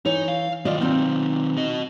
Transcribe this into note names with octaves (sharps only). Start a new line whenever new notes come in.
E3 D#4 C#5
F5
D#3 F#3 F4 D5 D#5
C4 D#4 F4
F#4 D#5